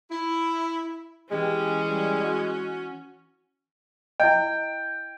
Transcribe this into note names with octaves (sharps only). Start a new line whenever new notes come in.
E4
E3 G#3 C#4 G4
G3
F#4
E4 D#5 G5